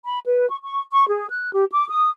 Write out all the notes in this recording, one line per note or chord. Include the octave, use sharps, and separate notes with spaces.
B5
B4
C#6
C#6
C#6
G#4
F#6
G4
D6
D#6